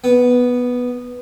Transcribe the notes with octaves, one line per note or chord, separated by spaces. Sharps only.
B3